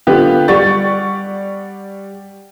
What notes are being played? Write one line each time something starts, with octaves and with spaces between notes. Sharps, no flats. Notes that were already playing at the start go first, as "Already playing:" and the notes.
D3 B3 F4 G4
G3 D5 F#5 C#6 A6